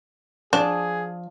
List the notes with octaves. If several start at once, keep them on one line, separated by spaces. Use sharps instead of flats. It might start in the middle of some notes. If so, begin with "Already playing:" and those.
F3 D4 G#4 A5